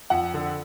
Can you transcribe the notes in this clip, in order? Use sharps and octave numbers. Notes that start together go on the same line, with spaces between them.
F2 F#5
D3